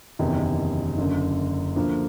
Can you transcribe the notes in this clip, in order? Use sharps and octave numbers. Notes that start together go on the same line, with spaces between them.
F#1 E2 C3 D#3
F#1 F#2 D3
D2 D3 F3 A#3